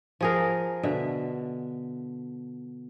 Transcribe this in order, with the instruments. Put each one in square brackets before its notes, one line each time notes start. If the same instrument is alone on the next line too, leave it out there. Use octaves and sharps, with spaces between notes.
[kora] F3 G#4 A#4
B2 D3 E5